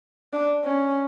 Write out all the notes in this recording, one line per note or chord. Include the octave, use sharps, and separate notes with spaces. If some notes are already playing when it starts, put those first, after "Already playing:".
D4
C#4